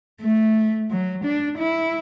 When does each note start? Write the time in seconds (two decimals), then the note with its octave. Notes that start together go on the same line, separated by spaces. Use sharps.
0.22 A3
0.91 F#3
1.25 D4
1.59 E4